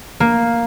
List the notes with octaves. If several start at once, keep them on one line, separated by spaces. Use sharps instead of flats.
A#3